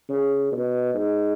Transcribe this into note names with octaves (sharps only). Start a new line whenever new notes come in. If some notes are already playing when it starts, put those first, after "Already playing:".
C#3
B2
G#2